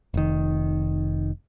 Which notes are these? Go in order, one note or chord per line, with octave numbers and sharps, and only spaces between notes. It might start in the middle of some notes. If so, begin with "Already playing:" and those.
F1 D#3